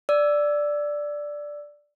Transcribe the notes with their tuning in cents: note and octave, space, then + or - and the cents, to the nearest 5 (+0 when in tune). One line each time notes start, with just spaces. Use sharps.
D5 +0 E6 +5